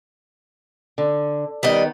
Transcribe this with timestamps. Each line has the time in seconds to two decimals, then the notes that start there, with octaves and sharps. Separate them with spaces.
0.98 D3
1.63 D#3 G3 B3 D5 D#5